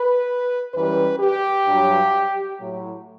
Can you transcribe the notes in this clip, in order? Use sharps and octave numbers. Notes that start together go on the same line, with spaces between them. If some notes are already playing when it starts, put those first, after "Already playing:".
Already playing: B4
F#2 E3 G3 B4
G4
G2 F#3
A2 F#3